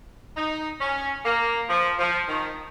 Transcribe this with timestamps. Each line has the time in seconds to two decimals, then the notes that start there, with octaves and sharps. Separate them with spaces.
0.36 D#4
0.80 C#4
1.25 A#3
1.69 F3
1.99 F3
2.28 D#3